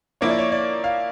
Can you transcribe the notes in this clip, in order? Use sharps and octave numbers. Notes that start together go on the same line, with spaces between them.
F3 A#3 E4 C#5
D5
C#5
D5
F5